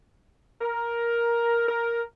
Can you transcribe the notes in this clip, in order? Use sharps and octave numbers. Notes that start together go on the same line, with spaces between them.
A#4
A#4